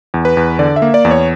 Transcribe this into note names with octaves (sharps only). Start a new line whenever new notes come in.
E2
B4
E2
D3 D5
E5
A#3
D5
E2
C#5